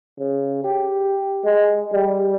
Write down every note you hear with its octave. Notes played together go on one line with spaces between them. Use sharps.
C#3
G4
G#3
G3